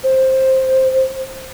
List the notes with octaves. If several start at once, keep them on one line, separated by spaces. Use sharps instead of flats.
C5